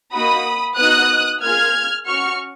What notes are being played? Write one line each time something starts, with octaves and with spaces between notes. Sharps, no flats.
A#3 D#4 F#4 B5 D#6
B3 D#4 F#4 D#6 F#6
A#3 F4 G#4 F6 G#6
C#4 F#4 C#6 F6